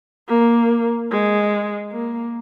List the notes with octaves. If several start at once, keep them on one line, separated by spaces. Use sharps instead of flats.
A#3
G#3
A#3